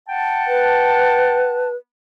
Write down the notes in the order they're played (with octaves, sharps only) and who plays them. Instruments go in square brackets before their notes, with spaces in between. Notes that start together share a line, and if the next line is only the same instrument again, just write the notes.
[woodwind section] F#5 G5 A5
[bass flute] B4